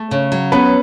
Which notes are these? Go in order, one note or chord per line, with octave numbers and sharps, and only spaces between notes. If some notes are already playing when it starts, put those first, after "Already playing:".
Already playing: A3
C#3
F#3
B3 C#4 B4